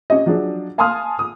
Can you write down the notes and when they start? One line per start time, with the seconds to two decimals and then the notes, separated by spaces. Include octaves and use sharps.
0.10 C#4 G4 D#5
0.26 F3 F#3 D4 G#4
0.78 F5 G#5 A5 C6 D#6 F6
1.19 D#6